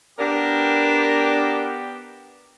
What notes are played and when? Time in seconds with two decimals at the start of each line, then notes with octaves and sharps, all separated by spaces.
0.19 B3 D4 G4 A#4